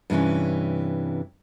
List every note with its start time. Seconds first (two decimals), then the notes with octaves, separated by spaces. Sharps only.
0.10 G2 C3 E3 C#4